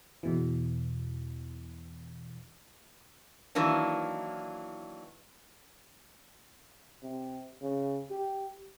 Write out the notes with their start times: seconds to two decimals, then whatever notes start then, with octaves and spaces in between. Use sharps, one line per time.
0.23 E2 B2 E3
3.55 D#3 E3 F#3 A#3 D4
7.03 C3
7.62 C#3
8.11 G4